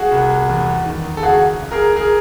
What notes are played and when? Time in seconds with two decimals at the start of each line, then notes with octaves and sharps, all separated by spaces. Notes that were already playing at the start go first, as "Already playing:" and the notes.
Already playing: F#4 G#4
0.12 C2
0.49 E2
0.86 D#3
1.17 A4
1.23 C#2 F#4 G#4
1.59 C#2
1.72 G#4 A#4
1.96 G#4 A#4